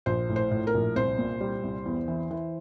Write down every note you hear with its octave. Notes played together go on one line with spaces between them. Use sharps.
A#1 C5
A2
C5
A2
A#4
A#1
C2 C5
A#2
G3
C2
E2
E3
E3